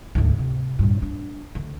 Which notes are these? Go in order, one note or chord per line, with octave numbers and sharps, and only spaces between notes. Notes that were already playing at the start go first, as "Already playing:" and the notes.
D2 G#2
C3
G2 A#2
D4
D2